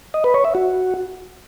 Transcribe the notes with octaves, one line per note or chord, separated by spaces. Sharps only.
D#5
B4
C#5
E5
F#4